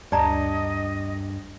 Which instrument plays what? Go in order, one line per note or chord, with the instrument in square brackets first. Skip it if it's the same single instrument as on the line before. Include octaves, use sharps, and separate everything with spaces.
[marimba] D2 [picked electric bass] G2 [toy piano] D5 A5 A#5 [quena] D#5